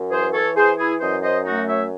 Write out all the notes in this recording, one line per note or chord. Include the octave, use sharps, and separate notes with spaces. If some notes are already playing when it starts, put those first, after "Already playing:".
Already playing: F#2
E3 G#4 C5
A4 C#5
E3 G#4 C5
E4 G#4
F#2 C5 D#5
C5 D#5
A3 D#4 F#4
C#5 E5